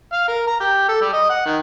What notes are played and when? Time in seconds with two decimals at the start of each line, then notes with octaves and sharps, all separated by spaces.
0.13 F5
0.28 A#4
0.47 A#5
0.60 G4
0.88 A4
1.01 G3
1.13 D#5
1.30 F#5
1.45 D#3